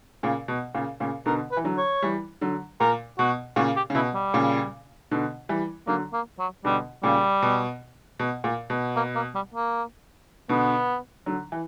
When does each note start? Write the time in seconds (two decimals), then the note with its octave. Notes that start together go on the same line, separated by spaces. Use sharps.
0.23 A#2 C#3
0.48 B2
0.75 A#2 C#3
1.00 A#2 C#3
1.26 B2 D3 A#4
1.51 B4
1.57 E3
1.64 D3 F#3
1.77 C#5
2.02 E3 G3
2.41 D3 F#3
2.80 A#2 A#4
3.18 B2 F#4
3.56 A#2 C#3 F#4
3.76 G4
3.90 C#3
3.95 B2 E4
4.14 G3
4.34 A#2 C#3
5.11 B2 D3
5.49 E3 G3
5.87 D3 F#3 A#3
6.13 A#3
6.39 F#3
6.65 B2 D3 G3
7.03 A#2 C#3 G3
7.42 B2
8.20 B2
8.44 A#2
8.70 B2
8.96 A#3
9.15 A#3
9.35 G3
9.54 A#3
10.49 B2 D3 B3
11.26 D3 F#3
11.52 E3